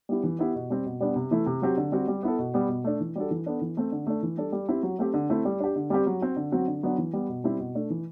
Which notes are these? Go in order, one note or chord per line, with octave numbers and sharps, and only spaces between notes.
G3 B3 E4 G4
E3
B3 E4 G4
B2
G3 C4
B2
G3 B3 D4
C3
E3 A3 E4
C3
F#3 C4 G4
D3
G3 C4 F#4
G3
B3 E4 A4
B2
G3 B3
B2
A3 D4
E3
G3 D4 F#4 A4
E3
B3 D4 A4
E3
A3 C4
D3
A3 D4
E3
G3 D4 A4
G3
C4 E4 G4
F#3
A3 C4 G4
D3
A3 C4 E4
G3
D4 G4
D3
G3 C4 G4
F#3
C4 F#4
D3
F#3 C4 F#4
D3
F#3 B3 D4
E3
G3 B3
B2
G3 C4 E4
B2
A3 D4
E3